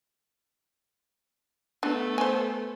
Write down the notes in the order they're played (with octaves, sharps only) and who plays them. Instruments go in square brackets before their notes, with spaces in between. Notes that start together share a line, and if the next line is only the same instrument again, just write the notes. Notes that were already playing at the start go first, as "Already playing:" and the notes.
[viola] A3 B3 [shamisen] D4
[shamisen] C5 G#5